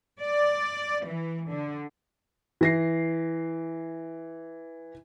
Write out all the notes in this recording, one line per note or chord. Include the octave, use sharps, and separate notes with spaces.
D5
E3
D3
E3 A#6 C7